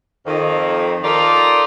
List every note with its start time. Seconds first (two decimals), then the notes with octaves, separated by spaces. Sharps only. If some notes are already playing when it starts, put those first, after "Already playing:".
0.26 F2 D#3
1.04 D#4 F4 G4 A4 A#4 D5